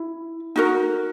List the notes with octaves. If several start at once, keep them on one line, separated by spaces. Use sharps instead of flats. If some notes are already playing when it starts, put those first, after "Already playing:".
Already playing: E4
D#4 F#4 A#4